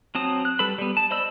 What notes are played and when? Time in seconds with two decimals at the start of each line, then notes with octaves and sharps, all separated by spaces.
0.15 F#3 C4 A5 D#6
0.45 F#6
0.59 G3 A4 B4 B5
0.78 G3 B3
0.97 A5
1.11 C5 D5 D#5 B5 E6